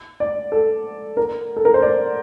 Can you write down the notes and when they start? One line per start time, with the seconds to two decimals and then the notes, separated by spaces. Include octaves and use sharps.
0.20 D5
0.52 A4
1.17 A#4
1.56 A4
1.65 A#4
1.74 C5
1.82 D5